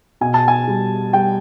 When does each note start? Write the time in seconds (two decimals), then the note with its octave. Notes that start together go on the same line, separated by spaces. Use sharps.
0.21 B2 G#5
0.34 A5
0.48 G#5
0.67 G3
1.13 G3 G5